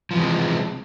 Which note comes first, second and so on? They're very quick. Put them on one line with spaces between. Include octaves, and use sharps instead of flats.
F3 E3 C3 G#3